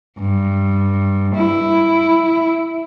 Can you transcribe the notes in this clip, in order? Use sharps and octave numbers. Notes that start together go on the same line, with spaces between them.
G2
E4